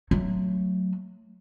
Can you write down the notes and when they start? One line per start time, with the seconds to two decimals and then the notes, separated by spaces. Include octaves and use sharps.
0.11 F#3 A3